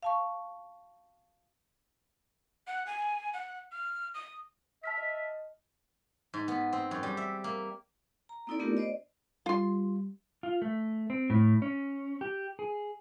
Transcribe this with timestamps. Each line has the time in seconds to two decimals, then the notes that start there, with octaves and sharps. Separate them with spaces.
0.03 F5 A5 C#6
2.67 F#5
2.86 G#5
3.33 F#5
3.72 F6
4.14 D#6
4.84 E5 A5 F6 B6
4.98 D#5
6.34 G#2
6.48 B3
6.73 C4
6.91 F#2
7.03 G3
7.17 E5
7.44 A#3
8.29 A#5
8.47 A#3 C4 D#4 E4 A4 D5
8.60 A3 B3 D4 F4 G4 A#4
8.77 C5 D5 D#5
9.46 G3 F4 C6
10.43 F4
10.62 A3
11.10 C4
11.30 A2
11.62 C#4
12.21 G4
12.59 G#4